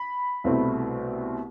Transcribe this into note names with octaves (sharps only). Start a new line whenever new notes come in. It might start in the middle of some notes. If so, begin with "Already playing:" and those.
Already playing: B5
C2 B2 A3 C4 E4